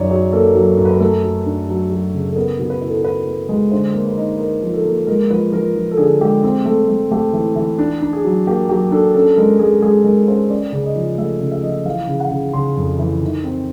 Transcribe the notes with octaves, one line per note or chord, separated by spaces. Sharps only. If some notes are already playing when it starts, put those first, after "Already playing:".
Already playing: F#2 D#3 C#5 D5
F#3 C#5
A#3 A4
F#3
F#2
B4
A#4
A3 A4
F#3
D4
F#3
F#3
C#3
A4
B3 A#4
B2
B4
E4
A4
A#4
E4 B4
B3
G#3
D3 C5
A#3
B4
D#4
D#4 A#4
F3
A4
A#3
G#3 A#4
F3 B4
F3 A#4
F3
A4
D3 G#4
G#3 G4
C4
A3
A3
A3 G4
E3
E3
D4
D4
G#4
F#3
A#3 G4
F#3 G4
D4 A4
C#4 A4
G#3 A#4
G#3 G#4
G#3 G#4
G#3 A#4
C#4 C5
C#4 D5
C#3
D#5
F3
A3 E5
C#3
E5
F3 D#5
E5
E3 F5
C#3
F#5
C#3
C#3 C6
F2
E3
D#3
C4